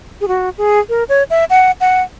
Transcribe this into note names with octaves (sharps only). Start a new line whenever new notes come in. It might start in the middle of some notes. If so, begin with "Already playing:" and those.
G#4
F#4
G#4
A#4
C#5
E5
F#5
F#5